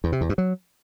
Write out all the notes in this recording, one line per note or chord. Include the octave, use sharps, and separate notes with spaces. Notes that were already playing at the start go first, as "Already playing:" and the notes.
E2
C3
E2
G2
F#3